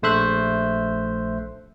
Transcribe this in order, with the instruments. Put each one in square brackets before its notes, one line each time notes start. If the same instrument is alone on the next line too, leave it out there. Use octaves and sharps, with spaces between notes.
[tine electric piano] A#1 A3 C5 E5 F#6